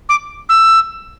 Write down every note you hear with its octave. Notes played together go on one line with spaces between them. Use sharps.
D6
E6